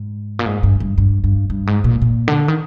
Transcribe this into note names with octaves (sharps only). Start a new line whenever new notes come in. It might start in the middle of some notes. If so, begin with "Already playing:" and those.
Already playing: G#2
A#2
G#2
G2
G2
G2
G2
G2
G#2
A#2
A#2
D3
D#3